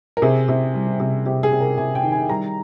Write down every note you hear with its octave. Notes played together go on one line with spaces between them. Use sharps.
A#4
C3 G#4
C3
G3
C3
C3 G4
G#4
C3
A#4
C3 G#5
G5
D#3
G#5
G3 A#5